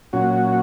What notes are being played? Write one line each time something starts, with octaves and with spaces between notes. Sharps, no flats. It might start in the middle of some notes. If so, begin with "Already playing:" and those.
A#2 F#3 C#4 F#4